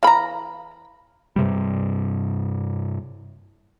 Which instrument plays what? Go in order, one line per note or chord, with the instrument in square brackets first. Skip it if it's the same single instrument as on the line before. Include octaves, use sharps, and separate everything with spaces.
[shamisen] E3 B5 [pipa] F5 A#5
[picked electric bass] G2 C3 G3